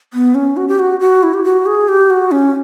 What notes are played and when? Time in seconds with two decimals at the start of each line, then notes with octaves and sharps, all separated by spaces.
0.14 B3
0.35 C#4
0.57 F#4
0.68 G4
0.79 F#4
1.00 F#4
1.23 E4
1.34 G4
1.44 F#4
1.66 G#4
1.88 G4
2.10 F#4
2.31 C#4